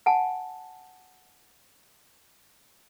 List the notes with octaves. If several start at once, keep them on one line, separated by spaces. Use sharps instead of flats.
F#5 G#5 A5